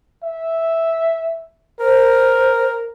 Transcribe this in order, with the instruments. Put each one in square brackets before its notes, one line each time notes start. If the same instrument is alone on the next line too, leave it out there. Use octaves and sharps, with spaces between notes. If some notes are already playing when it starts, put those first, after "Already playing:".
[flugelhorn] E5
[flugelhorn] A#4 [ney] C5